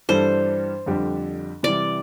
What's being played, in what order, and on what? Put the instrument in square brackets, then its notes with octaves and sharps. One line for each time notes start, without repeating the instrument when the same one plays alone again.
[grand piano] G2 E3 G3 D4 A4 [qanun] C5
[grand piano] F2 D3 G3 D4 G4
[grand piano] C3 E3 G3 [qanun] D5